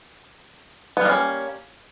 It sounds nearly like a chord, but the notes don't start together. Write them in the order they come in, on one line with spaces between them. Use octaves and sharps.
B3 G3 A#3 C#4